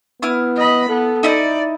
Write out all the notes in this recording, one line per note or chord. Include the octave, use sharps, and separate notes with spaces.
B3 E4 D#6 F6
D#5 B5
B3 A4
D#4 E4 D5 D#5